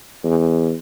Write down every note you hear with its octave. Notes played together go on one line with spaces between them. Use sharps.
E2